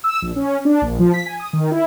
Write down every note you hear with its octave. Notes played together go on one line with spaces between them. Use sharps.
E6
A#1
C#4
D4
A#1
F3
B6
G#5
D#6
D#3
E4